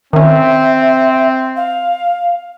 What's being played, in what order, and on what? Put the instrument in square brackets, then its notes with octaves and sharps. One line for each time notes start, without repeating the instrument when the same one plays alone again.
[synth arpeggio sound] D#3 C#4 [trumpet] C4 [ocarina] E5
[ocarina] F5